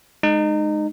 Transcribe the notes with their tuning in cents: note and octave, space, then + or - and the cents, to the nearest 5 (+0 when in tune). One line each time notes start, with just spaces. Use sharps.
G#3 +15 D#4 -25